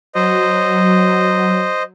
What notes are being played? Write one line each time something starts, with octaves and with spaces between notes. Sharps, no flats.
F#3 C5 D#5